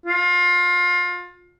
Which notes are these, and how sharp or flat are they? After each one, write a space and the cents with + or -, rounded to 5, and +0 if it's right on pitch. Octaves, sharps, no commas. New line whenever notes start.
F4 +25